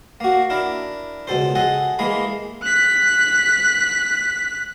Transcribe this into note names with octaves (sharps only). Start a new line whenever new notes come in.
A#3 F#4
D4 E4 A#4
C#2 B2 A4 C5
G#4 A4 D#5 F#5
E3 G#3 A#3 G#4 B5
F#6 B6